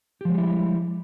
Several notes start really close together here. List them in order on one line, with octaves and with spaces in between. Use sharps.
G4 F3 G#3 G3 E4